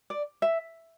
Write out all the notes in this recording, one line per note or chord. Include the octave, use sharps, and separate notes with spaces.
D5
E5